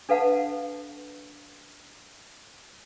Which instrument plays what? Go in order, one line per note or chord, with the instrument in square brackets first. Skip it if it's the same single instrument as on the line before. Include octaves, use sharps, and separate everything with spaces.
[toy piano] D4 A4 B4 F5 F#5 A5